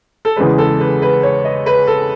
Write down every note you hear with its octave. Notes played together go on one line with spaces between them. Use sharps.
A4
E2 C#3 E3 G#3 B4
A4
B4
B4
C#5
D#5
B4
A4